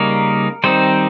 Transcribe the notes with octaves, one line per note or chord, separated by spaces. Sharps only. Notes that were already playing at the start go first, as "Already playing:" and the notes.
Already playing: C#3 G3 A#3 D#4 A#4
D#3 G3 C4 D#4 C5